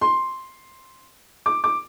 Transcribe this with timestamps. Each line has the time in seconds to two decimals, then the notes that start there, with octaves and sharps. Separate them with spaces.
0.01 C6
1.46 D6
1.64 D6